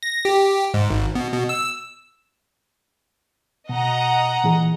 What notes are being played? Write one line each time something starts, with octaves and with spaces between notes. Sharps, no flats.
A#6
G4
G#2
G#1
B2
B2
E6
B2 D#5 F#5 A#5
A#2 E3 G#4